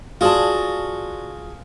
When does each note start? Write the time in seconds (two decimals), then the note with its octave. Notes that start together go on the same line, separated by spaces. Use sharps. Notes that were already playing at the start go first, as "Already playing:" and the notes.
0.21 F4 F#4 G#4 D5 A5